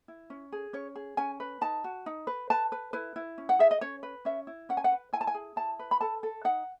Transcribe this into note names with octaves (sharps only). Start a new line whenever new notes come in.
E4
C#4
G#4
C#4 C#5
G#4
C#4 G#5
B4
D#4 A5
F#4
D#4
B4
B4 A5
B4
E4 B4
E4
C#4
F#5
G#4 E5
D#5
C#4 C#5
B4
C#4 E5
E4
C#4 F#5
G#5
F#5
B4
E4 G#5
A5
G#5
G#4
E4 A5
B4
B5
A4 A5
A4
D#4 F#5